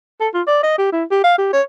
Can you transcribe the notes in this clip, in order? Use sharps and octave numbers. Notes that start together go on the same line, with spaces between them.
A4
F4
D5
D#5
G4
E4
G4
F5
G4
C#5